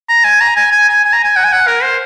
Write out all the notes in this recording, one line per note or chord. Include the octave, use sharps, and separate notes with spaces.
A#5
G#5
A#5
G#5
G#5
G#5
G#5
A#5
G#5
F#5
G#5
F#5
A#4
C5